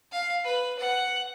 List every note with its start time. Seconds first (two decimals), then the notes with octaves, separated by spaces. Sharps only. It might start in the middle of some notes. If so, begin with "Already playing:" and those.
0.12 F5
0.44 B4
0.79 F#5